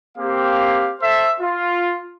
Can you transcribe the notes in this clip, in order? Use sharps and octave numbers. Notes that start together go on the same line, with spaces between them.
A#3 C4 G4 F5
A4 C5 E5
F4